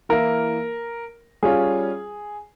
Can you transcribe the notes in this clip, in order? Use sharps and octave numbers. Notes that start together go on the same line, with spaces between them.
E3 A#3 E4 A#4
G3 C#4 F4 G#4